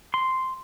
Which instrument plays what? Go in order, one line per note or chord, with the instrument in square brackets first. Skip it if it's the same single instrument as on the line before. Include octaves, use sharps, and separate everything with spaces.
[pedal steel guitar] C6